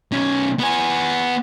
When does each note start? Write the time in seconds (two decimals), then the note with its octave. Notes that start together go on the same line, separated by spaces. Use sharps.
0.12 B1 C#4
0.59 B3 G#5